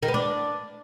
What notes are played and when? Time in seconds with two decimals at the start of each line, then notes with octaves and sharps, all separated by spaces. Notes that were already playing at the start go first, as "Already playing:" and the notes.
0.03 D#3
0.08 B3
0.14 D4